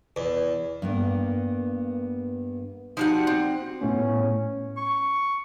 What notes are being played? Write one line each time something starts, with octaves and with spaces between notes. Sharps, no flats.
E2
G2 A#3 B3
F3 G3 D#4 F#4 F#5
C4
A2 A3 B3 C#4
C#6